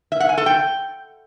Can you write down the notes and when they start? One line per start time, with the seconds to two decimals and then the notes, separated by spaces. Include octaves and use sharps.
0.12 E5
0.20 F#5
0.29 G#5
0.38 A4
0.46 G5